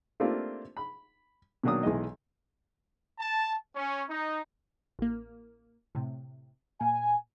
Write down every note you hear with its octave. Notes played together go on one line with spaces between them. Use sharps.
A3 A#3 C4 D4 F4 G4
B5
B2 D#3 F#3 A#3 D4 D#6
B1 E3 G#3 D#5
A5
C#4
D#4
A1 A#3
A2 C3
A#2 G#5